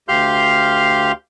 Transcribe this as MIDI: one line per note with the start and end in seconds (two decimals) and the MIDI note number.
0.09 1.12 38
0.09 1.12 67
0.09 1.12 77
0.09 1.12 84
0.09 1.12 89
0.09 1.12 91